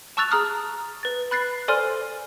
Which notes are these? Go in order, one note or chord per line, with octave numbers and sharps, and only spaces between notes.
A5 C#6 E6 F#6 A6 F7
G#4 A#5 D#6 F6
B4 A6
B5 F#6 A6 C7
A4 C5 D5 G#5 C6 F6